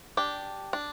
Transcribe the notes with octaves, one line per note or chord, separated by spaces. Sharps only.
D4 G4
D4